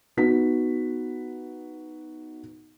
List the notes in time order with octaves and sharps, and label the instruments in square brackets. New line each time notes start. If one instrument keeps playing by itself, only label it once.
[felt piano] B3 D#4 F#4 B6